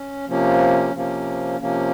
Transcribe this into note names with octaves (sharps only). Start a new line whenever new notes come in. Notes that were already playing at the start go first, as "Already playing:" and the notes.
Already playing: C#4
C3 F3 A#3 C#4
C3 F3 A#3 C#4
C3 F3 A#3 C#4